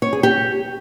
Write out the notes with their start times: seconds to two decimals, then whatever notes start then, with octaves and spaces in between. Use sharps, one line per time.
0.02 C#5
0.13 G#4
0.23 G4